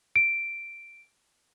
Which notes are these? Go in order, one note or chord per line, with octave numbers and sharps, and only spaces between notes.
D7